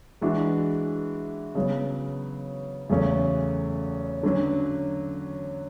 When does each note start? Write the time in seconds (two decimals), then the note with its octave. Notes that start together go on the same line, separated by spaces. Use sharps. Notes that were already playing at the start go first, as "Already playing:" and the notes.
0.21 E3 G#3 D4 F#4
1.55 C#3 F#3 B3
2.90 E2 C#3 F#3 A3 C#4
4.23 D3 F#3 C#4